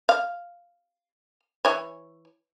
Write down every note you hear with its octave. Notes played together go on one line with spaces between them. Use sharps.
F5
E3 C#5